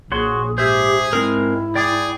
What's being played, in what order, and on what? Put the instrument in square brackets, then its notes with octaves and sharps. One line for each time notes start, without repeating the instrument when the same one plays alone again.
[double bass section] A#1 [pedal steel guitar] F#4 C#5 C6 [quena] G#4
[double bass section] G#2 [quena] G4 [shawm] G#4 [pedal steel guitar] C5 E5
[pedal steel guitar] G#3 C4 A#4 [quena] E4
[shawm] G#4 [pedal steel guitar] D5 G5 D6